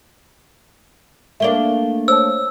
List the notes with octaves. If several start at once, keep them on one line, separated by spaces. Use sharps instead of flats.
A3 A#3 D4 E5 G7
C5 C#5 A5 E6